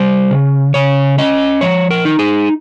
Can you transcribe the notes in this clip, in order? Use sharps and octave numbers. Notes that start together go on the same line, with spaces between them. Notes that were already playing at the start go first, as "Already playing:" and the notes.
Already playing: G3 C5
C#3
C#3 C#5
C#4 D#5
F3 C#5
A#4
D#4
G#4